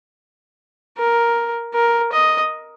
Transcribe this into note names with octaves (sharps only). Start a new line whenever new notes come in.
A#4
A#4
D#5